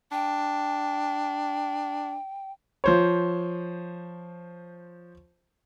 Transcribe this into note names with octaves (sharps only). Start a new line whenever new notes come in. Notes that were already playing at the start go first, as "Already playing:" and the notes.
D4 G5
F3 C5 C#5